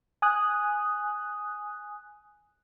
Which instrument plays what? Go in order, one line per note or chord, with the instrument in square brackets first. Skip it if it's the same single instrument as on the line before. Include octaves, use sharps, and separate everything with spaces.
[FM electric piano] G#5 D#6 F#6